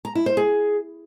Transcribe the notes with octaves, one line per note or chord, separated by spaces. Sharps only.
A#5
E4
C5
G#4